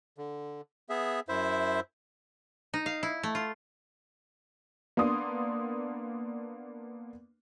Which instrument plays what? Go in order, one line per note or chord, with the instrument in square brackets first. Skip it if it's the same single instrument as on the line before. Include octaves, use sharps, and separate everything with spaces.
[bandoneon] D3
B3 G#4 E5
F#2 E4 C5 E5
[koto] D#4
F5
E4
A3
F4
[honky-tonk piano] A#3 B3 D4 C6 D#6